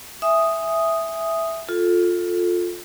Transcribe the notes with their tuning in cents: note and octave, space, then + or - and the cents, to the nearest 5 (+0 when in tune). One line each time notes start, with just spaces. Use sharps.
E5 +0 G#5 -5 D#6 +0
F4 +15 A4 +0